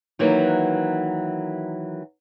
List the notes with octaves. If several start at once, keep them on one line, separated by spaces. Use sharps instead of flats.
D#3 E3 F#3 A#3